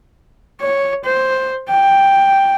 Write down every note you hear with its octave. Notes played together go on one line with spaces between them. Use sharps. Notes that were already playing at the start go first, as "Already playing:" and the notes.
C#5
C5
G5